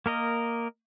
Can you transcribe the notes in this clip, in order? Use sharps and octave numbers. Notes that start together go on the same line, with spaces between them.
A#3 A#4 D#5